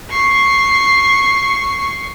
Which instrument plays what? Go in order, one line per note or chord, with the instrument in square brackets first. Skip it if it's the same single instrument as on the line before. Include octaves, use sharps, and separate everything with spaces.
[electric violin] C#6 C7